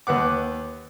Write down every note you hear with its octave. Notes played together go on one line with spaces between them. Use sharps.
D#2 B4 F#5 D6